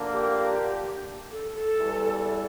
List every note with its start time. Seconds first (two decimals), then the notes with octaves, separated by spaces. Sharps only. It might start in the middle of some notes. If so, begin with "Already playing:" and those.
Already playing: D3 F3 A#3 D4
0.13 G4
1.31 A4
1.55 A4
1.78 E2 E3 G3